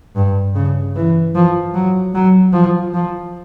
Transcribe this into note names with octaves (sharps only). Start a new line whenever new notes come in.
G2
C#3
E3
F3
F#3
F#3
F3
F3